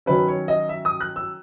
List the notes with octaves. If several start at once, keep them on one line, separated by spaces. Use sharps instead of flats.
D#3 F#3 C#4 B4
C#5
D#5
E5
D#6
F#6
E6